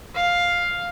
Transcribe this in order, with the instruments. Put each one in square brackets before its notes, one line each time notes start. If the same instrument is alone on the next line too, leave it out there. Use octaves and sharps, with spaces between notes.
[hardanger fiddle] F5